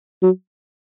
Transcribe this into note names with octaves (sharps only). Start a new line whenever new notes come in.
F#3